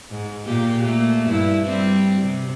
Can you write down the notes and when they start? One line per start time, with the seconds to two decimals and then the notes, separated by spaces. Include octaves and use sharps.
0.11 G#2
0.45 A#2 A#3 G4
0.83 A3 A#3
1.26 G2 E4
1.65 G3 C4
2.22 C3